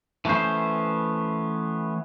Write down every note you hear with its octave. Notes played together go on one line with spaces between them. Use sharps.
E3 A3 B3 C#4 C5